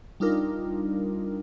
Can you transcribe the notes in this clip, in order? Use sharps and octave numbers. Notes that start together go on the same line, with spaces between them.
G3 D4 D#4 F4 A#4